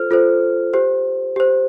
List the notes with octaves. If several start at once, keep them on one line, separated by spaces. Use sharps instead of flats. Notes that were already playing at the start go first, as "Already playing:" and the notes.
Already playing: F4 A4 C5 F6
F4 A4 C5
G4 C5
G4 C5